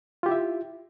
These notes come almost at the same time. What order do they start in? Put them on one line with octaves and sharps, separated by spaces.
F4 G4 E4 E5